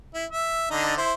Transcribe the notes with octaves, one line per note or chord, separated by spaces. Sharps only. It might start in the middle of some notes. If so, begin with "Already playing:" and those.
E4
E5
D3 D4 D#4
E4 C5